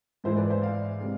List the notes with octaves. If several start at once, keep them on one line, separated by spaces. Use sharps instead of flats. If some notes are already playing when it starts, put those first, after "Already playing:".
G#2 E3 G#3 C5 E5
B4 D5
C5 E5
D5 F5
C3 G#3